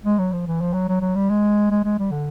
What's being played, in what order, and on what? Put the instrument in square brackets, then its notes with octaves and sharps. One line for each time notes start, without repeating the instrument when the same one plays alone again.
[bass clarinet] G#3
F#3
F3
E3
F3
F#3
F#3
F#3
G3
G#3
G#3
G#3
G3
D3